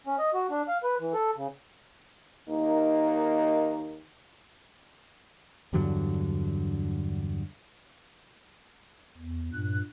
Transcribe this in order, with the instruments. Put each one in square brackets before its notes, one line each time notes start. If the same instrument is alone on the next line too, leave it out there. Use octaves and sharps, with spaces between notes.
[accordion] C#4
D#5
F#4
D4
F5
B4
E3
A4
C#3
[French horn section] D#2 A#3 D#4
[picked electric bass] E2 G2 D3 F#3
[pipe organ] E2
G2 A#2 F#6